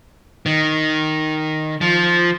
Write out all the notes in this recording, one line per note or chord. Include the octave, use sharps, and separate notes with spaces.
D#3
F3